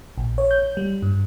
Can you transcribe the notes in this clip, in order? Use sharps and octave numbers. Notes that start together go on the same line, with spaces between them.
A#1
C#5
G6
G3
G2